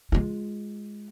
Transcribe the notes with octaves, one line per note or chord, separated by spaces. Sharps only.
G#3 F4